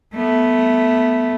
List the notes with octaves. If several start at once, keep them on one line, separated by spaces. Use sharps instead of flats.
A3 B3